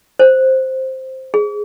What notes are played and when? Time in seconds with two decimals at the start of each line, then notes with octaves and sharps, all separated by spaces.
0.19 C5
1.34 G#4